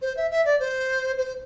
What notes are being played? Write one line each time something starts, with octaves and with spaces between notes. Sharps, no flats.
C5
E5
E5
D5
C5
C5